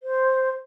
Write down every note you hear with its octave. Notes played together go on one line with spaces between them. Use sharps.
C5